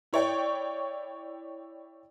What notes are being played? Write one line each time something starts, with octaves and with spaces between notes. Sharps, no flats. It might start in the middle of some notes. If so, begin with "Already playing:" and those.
E4 C#5 D5 G5 C#6